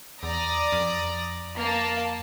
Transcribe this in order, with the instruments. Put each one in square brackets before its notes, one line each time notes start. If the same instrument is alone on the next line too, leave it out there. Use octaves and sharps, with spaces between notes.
[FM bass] E2 [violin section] D5 A#5 D#6
[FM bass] F2
[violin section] A#3 A5